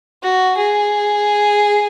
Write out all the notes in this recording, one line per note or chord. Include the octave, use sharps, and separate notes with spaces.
F#4
G#4